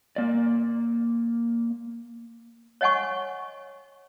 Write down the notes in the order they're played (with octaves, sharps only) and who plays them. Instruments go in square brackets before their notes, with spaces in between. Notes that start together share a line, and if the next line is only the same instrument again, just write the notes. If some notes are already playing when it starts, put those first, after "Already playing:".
[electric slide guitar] A#3 D5
[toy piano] C#5 D#5 F#5 G#5 C#6